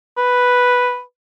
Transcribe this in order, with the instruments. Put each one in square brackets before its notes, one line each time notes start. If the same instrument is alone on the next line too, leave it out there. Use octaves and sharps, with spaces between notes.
[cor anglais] B4